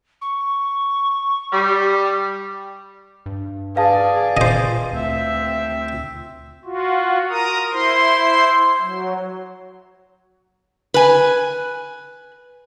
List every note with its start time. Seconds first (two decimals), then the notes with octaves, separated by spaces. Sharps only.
0.21 C#6
1.53 G3
3.26 G2
3.76 G#4 B4 D5 F5 A5
4.37 A#2 C5 D#5
4.93 D2 C4 E5
6.64 F4 F#4
7.29 A#4 A#5 D#6
7.73 E4 C5 C6
8.81 F#3
10.94 B4 G#5